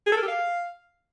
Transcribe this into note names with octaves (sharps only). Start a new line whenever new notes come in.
G#4
A4
A#4
G4
F5